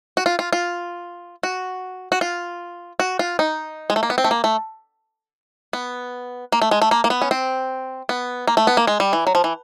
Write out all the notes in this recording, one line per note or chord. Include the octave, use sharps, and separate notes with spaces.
F#4
F4
F4
F4
F#4
F#4
F4
F#4
F4
D#4
G#3
A3
A#3
B3
C4
A3
A#3
A3
B3
A#3
A3
G#3
A3
A#3
A#3
B3
C#4
C4
B3
A#3
A3
B3
A#3
G#3
G3
E3
F#3
F3
E3